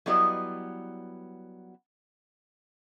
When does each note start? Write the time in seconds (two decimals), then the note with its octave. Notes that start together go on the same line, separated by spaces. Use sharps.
0.06 F#3 G3 B3 E4 D5 D#5